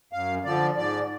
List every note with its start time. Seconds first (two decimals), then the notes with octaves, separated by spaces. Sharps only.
0.12 F#2 F5
0.44 D3 F3 D5
0.76 G#2 D5